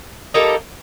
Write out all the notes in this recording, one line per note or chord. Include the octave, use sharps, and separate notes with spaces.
G3 A#3 D#4 A4